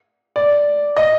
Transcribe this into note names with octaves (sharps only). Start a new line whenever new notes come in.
D5
D#5